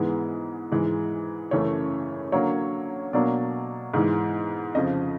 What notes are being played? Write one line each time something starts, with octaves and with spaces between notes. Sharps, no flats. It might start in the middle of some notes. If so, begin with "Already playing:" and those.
Already playing: G#2 E3 G#3 B3
G#2 E3 G#3
F#2 C#3 E3 A3 C#4 C#5
D3 F#3 A#3 C#5
B2 F#3 A#3 D4 D5
G#2 E3 G#3
F2 C#3 F3 D#5